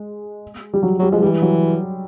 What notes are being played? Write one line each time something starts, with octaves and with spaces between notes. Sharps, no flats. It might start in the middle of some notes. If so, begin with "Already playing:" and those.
Already playing: G#3
G3
F#3
F#3 G3
F3 G#3
E3 G3
F#3